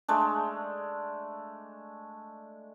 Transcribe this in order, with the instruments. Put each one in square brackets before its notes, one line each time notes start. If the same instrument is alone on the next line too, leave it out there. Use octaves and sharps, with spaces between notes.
[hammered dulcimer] G#3 A3 D4